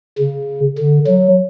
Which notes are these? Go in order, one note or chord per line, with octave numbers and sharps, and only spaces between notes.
C#3
D3
F#3